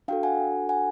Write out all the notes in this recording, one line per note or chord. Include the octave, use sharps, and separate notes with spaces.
D4 F#4 A4 F5 G5
F#5 G#5
F#5 G#5